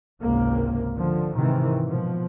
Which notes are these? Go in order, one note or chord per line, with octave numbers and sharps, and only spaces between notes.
G#1 C#2 C3 A#3
D3 F3
G#2 C3 D#3 E3 C4
B2 F3